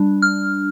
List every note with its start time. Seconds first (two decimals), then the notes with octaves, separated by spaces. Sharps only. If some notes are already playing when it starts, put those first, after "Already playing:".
Already playing: G3 D4
0.22 F6